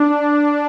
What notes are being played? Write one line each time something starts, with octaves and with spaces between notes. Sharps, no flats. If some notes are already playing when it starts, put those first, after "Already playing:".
Already playing: D4